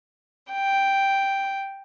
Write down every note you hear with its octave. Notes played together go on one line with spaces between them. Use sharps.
G5